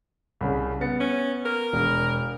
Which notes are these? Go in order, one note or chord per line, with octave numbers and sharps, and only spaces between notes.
C2 C#3
B3 A6 C#7
C#4
A#4
E1